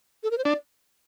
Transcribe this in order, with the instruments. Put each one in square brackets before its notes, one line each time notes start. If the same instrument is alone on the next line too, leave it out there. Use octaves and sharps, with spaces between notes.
[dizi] A4
A#4
C5
[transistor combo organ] D4 [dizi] D5